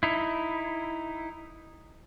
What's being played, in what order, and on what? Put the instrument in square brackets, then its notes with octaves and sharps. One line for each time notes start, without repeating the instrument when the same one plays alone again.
[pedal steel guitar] D#4 E4